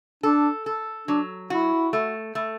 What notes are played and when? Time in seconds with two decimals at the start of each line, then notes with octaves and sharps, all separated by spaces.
0.23 D4 A4
0.66 A4
1.08 F#3 D4
1.50 E4 F#4
1.93 A3
2.35 A3